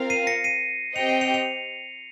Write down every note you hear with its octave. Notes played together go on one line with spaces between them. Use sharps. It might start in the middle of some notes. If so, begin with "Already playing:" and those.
Already playing: C4 F4 A#4 F5
C7 D#7
A#6 C#7
C7 D#7
C4 G4 C5 D#5 G5 C#7 F7
C7 D#7
C#7 F7
C#7 F7